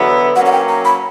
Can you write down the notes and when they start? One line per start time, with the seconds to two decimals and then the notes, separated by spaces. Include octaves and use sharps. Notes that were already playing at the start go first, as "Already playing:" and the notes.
Already playing: E2 D3 F#3 B3 E4
0.35 F#3 A#3 C#4 F#5
0.46 F#5
0.52 G5
0.68 A#5
0.85 B5